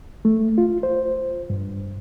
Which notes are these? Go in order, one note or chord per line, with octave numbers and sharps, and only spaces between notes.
A3
F4
C5
G2